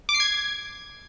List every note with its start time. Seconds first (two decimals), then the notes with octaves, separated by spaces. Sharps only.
0.09 D6
0.14 C7
0.20 G#6